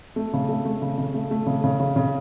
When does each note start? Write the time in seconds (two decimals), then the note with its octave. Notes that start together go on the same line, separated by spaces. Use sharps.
0.16 A3
0.33 C#3
0.49 A3
0.65 A3
0.82 C#3
0.98 C#3
1.14 A3
1.31 A3
1.46 C#3
1.64 C#3
1.80 C#3
1.96 C#3